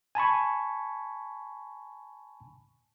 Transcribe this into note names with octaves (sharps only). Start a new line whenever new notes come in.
G#5 A5 B5 C#6